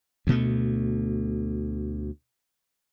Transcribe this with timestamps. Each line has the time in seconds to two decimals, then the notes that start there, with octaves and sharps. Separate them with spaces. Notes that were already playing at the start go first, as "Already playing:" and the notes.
0.27 D2 B2 A3